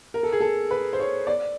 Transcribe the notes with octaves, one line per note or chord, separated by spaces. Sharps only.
A#4
A4
G#4
A4
B4
C5
C#5
D5